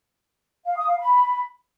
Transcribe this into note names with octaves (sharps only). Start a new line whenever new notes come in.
F5
D#6
F5
B5